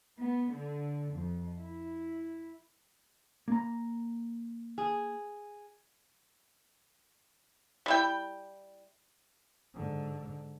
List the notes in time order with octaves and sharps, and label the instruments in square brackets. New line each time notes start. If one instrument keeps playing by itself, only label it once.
[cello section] B3
D3
F2
E4
[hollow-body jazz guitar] A#3 A#5
[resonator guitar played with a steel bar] G#4
[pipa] G3 E4 G5
[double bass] G#2 D3